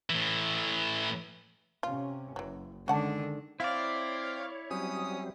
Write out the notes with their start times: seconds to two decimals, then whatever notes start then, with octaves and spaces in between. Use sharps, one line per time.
0.10 A2 E3
1.83 C3 C#4 F4
2.36 F#1 E3 F#3
2.88 D3 D#3 G#3 C#4 D4 F#5 A5
3.60 C4 E4 C#5 D5 F5
4.71 F#3 G3 C4 C#4 D#6